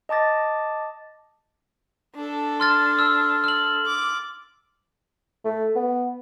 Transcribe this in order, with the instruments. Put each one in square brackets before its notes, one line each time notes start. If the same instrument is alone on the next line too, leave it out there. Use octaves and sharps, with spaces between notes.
[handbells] D#5 A5 D6 A6 A#6
[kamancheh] D4 A4
[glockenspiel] C6 F6 A6
E6 F6
F6 F#7
[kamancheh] D6
[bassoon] A3
B3